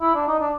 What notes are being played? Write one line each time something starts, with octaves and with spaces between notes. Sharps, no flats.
E4
D4
D#4
D4